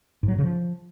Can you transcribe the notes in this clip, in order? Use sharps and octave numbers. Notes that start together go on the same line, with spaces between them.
G#2
F#3
A2
C#3
F3